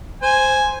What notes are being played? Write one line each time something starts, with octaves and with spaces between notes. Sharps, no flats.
C5 G#5